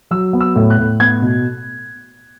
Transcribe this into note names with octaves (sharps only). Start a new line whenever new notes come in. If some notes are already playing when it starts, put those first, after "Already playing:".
F#3 E6
B3
E6
A2
F#6
A2
B3 G#6
B2